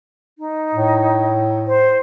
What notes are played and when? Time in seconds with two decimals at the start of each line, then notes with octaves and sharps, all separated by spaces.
0.38 D#4
0.75 A2
1.67 C5